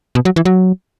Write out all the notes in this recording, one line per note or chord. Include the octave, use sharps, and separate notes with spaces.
B2
F#3
E3
F#3